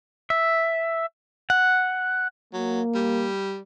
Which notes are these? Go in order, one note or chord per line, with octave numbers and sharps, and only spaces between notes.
E5
F#5
F#3 A#3
G3